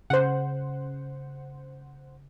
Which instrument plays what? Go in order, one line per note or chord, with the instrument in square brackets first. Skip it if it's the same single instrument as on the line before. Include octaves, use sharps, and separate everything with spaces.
[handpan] C#3 [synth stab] C5 F#5